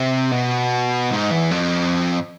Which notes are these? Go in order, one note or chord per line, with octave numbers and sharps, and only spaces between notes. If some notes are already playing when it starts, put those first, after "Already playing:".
Already playing: C3
B2
G#2
E2
F2